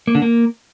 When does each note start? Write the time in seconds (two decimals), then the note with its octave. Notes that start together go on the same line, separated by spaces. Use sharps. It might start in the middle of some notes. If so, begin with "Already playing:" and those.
0.07 A#3
0.15 D3
0.22 A#3